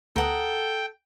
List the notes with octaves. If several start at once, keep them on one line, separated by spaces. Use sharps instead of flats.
D2 B3 A4 A#4 F#5 G5 A5 D#6